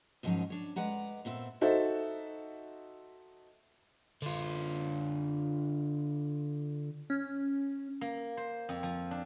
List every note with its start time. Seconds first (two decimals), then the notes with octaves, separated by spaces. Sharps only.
0.23 D#2 G#2 F3 F#3 C#4 D#4
0.50 D4 C#5
0.76 G#3 B4 D5 F#5 A#5
1.25 A#2 B3 C4 E5
1.61 D#4 F#4 A4 C5 E5
4.22 D3 F4
7.10 C#4
8.01 A#3
8.37 C5
8.69 F2
8.83 F3
9.11 D4